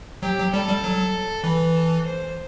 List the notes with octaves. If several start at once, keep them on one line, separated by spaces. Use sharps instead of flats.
F#3 G4
F#3
G3 A4
G3
F#3
E3 B4
A4
C5